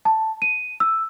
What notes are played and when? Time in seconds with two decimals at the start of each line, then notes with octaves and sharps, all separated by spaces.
0.05 A5
0.42 D#7
0.80 E6